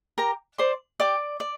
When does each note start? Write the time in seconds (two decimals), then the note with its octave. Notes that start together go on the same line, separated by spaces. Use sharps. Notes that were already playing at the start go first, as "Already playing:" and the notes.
0.18 G4 A#4 A#5
0.58 C5 D5 C6
1.00 G4 D5 D6
1.40 D5